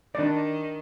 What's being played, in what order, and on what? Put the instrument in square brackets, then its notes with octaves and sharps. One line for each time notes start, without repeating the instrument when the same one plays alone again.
[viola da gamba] D#3 [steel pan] D4 D5